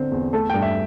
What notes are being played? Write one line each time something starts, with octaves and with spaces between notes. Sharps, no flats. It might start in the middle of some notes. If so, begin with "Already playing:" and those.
Already playing: D3 C4 C5
E2
A3 A4
G2 G5
E5